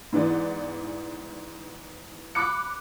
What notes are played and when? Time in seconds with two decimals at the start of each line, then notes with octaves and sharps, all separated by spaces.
0.13 G#2 E3 B3 D5
2.35 B5 D6 F#6 C#7